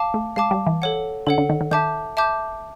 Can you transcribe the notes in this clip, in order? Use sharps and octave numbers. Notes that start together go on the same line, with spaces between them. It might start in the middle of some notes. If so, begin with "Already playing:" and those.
Already playing: F5 A5 D6
A3
G#3 F5 A5 D6
G3
E3
A4 C#5 F#5
D3 A4 C#5 F#5
D3
D#3
D#3
D#3 E5 A5 D6 G6
E5 A5 D6 G6